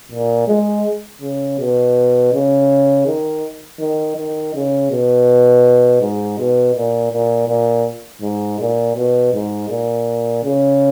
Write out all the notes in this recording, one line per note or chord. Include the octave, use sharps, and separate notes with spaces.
A#2
G#3
C#3
B2
C#3
D#3
D#3
D#3
C#3
B2
G#2
B2
A#2
A#2
A#2
G#2
A#2
B2
G#2
A#2
C#3